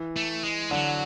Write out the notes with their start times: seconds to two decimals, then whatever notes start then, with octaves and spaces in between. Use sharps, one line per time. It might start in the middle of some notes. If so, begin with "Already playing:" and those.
Already playing: E3
0.16 A3
0.44 G#3
0.71 D3 F#3